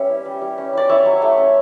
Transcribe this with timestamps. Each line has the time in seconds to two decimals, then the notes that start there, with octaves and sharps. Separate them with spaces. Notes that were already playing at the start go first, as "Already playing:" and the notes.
Already playing: G3 C#4 B4 C#5 E5
0.09 E4
0.25 G3
0.41 G3
0.58 C#4
0.73 E4 D5
0.89 E4 C#5 E5
1.05 F#3
1.22 A3
1.37 C#4